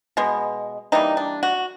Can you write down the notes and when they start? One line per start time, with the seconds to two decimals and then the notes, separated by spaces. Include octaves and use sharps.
0.17 B2 G#3 B3
0.92 E3 G3 A#3 D#4
1.17 D4
1.43 F#4